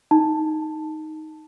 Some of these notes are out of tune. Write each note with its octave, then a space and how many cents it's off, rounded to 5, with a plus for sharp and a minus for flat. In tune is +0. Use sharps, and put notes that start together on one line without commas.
D#4 +5 A5 +0